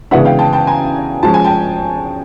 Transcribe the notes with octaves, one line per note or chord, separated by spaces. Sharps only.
C#3 E3 G#3 B3 D4 E5 F#5
F5 G5
G5 A5
G5 A5
G#5 A#5
F3 G#3 C#4 A5
G#5
G5 A5